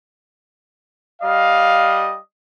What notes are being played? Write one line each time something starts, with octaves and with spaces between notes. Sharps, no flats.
G3 D#5 F5